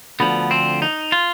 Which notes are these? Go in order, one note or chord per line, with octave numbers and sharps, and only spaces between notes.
D2 D3 F3 B3
C4
D#4
F4